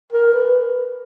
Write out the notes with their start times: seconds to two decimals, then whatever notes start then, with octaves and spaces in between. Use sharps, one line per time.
0.13 A#4
0.33 B4